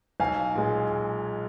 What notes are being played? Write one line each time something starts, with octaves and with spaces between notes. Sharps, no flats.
B1 F5 G#5
A#2 G#3